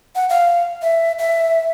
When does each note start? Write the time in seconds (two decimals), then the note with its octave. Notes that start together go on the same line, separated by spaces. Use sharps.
0.15 F#5
0.30 F5
0.82 E5
1.19 E5